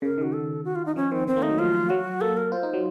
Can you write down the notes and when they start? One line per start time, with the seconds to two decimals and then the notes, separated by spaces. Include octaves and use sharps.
0.02 C#3 A#4
0.18 D#3 F#4
0.33 A4
0.65 F#4
0.75 F4
0.86 D#4
0.96 F3 C#4
1.11 D#3 C4
1.28 D#3 C4
1.36 A#3
1.42 A3 D#4
1.50 F#3
1.58 F3 F4
1.90 F#3 F#4
2.21 A#3 A4
2.37 A#4
2.52 F4 C5
2.63 D#4
2.73 F#3